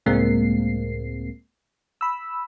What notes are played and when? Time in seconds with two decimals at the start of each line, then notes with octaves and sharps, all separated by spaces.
0.06 C#2 A2 G#3 A#3 C4 C7
2.01 B5 E6